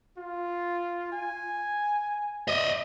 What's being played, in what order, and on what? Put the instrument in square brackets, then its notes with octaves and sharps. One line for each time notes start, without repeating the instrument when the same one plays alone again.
[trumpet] F4
G#5
[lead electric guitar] D#5 E5